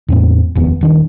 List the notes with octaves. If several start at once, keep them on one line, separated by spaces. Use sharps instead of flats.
E2 A2 C4
F1 D#2 B3
D#1 D#3 D4